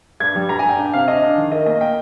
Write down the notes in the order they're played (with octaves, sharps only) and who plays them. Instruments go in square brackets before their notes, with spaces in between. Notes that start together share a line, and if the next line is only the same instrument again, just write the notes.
[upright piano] G2 [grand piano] G#6
[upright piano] G3
[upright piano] G2 [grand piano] A#5
[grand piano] G#5
[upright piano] G2 [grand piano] G5
[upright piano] D4 [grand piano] G5
[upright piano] C3 [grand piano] F5
[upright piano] D4 [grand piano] D#5
[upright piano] D4
D#3
[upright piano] A#4 [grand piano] D#5
[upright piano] A#3 [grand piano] D#5
[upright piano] A#3 [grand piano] G5